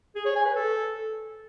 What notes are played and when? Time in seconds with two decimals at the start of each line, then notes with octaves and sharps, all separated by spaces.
0.15 G#4
0.25 C#5
0.36 G#5
0.46 B4
0.56 A4